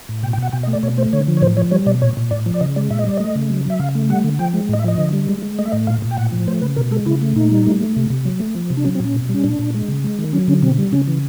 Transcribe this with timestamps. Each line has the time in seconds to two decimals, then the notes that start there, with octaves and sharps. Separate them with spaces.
0.09 A2
0.23 B2 G5
0.33 G5
0.38 B2 F#5
0.53 B2 G5
0.63 D#5
0.67 A3
0.73 D5
0.83 B2 C#5
0.97 A3 C5
1.13 D3 C#5
1.27 F3
1.37 C#5
1.42 A2 C5
1.57 F3 C#5
1.71 G3 C#5
1.86 B2 D5
2.02 A#2 C#5
2.17 A#2
2.31 A2 D5
2.46 F3
2.54 D5
2.61 C#3 D#5
2.76 G#3 D5
2.90 A#2 E5
2.99 D#5
3.06 G3 D5
3.17 A3 D#5
3.35 C#3
3.50 F#3
3.65 F#3 E5
3.79 C#3 F5
3.95 A3
4.09 G3 F#5
4.24 D3
4.39 F3 G5
4.54 G#3
4.69 A2 D#5
4.79 E5
4.84 F3 D#5
4.98 D3
5.13 G3
5.29 G#3
5.43 G#3
5.59 A3 D#5
5.65 E5
5.72 A2 D#5
5.87 A#2 F5
6.02 A#2
6.11 G5
6.18 A2 F#5
6.32 F3
6.48 A3 C5
6.61 C#3 B4
6.76 B2 A#4
6.91 G#3 A4
7.06 C#3 E4
7.22 A3
7.36 A#2 D#4
7.52 G3
7.66 A3
7.81 A3
7.96 C3
8.10 C3
8.25 F#3
8.40 A3
8.55 F3
8.70 C3
8.77 D4
8.85 F#3 C#4
8.95 C4
9.00 A#2 C#4
9.14 B2
9.29 G3 C#4
9.44 A#2 D4
9.59 A#2
9.75 G#3
9.88 C#3
10.04 G#3
10.19 D#3
10.33 F#3 C#4
10.48 D3 C#4
10.62 B2 C4
10.78 G3
10.93 C#3 C#4
11.07 E3